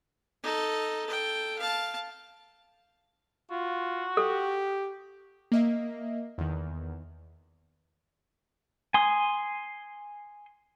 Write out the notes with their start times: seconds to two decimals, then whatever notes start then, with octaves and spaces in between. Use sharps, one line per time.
0.43 D#4 A4
1.06 A4 G5
1.58 F5 A5
3.50 F4 F#4
4.17 G4 A4
5.52 A#3 D#5 E5
6.38 E2 D#3
8.94 G#5 C6 D#6